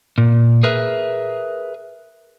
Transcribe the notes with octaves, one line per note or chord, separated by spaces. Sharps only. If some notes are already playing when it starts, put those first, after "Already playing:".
A#2
G#4 A#4 B4 E5